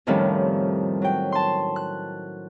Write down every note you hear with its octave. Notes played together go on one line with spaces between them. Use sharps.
F2 A2 D#3 F3 G3 C#4
F#3 G5
A5 C6
F#6